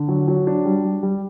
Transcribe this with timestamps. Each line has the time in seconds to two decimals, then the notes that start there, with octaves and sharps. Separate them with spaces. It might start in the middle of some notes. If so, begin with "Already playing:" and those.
Already playing: D3
0.08 F#3
0.28 F#3
0.47 D4
0.65 G3
0.84 G3
1.03 G3